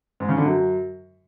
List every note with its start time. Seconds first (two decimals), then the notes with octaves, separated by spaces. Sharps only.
0.20 G#2
0.29 C#3
0.37 D3
0.45 F#2